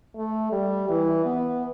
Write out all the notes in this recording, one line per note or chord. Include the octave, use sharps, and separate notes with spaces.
A3
G3
E3
B3